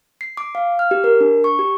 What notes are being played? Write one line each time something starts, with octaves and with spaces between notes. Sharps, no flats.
C7
D6
F5
F6
G4
A#4
D4
C#6
G4